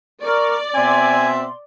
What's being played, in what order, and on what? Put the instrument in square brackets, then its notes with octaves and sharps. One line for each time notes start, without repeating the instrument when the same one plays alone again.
[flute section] A#4 C#6 [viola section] D5
[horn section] B2 C4 E5 [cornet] G#5 [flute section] C6